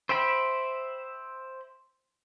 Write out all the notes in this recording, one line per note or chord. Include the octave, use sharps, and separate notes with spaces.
C5 E5 G5 B5